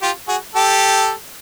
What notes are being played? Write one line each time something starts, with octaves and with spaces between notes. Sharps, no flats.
F4 G4
F#4 G#4
G4 A4